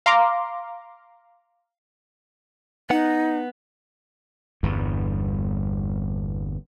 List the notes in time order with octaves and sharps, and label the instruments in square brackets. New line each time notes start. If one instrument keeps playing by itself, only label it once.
[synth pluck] F5 A#5 C6 D6
[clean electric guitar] B3 F#5 [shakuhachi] D#4
[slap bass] G1 E2 G2